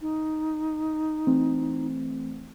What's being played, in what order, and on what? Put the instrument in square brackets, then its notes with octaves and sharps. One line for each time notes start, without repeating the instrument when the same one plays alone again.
[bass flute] D#4
[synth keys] E3 A3 C4